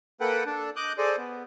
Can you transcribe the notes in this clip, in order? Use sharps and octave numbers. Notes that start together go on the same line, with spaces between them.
A#3 A4 B4 F#5 G5
D4 A4
D#5 D6 F#6 G6
G#4 A4 C5 D5 D#5
B3